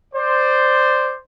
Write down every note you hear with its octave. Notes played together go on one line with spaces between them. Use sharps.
C5 D5